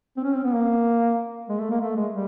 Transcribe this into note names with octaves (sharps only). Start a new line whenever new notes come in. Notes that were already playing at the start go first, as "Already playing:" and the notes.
C4
C#4
C4
B3
A#3
G#3
A3
A#3
A3
G#3
G3